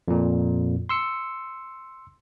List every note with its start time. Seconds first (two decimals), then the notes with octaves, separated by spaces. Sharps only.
0.08 F2 A#2
0.89 C6 E6 C#7